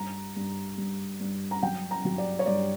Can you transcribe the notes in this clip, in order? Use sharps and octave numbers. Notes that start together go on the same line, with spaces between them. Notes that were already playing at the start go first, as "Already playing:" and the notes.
Already playing: G2 A#5
G2
G2
G2
A#5
F#3 G5
A#5
F#3
D5
C#5
G2 D5